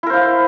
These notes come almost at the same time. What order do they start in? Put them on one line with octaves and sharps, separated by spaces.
E4 A#4 C5 F5